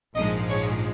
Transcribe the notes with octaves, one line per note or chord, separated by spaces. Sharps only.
A#1 G#2 F3 G#3 D#5
C#5